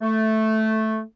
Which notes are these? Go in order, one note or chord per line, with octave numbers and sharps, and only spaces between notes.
A3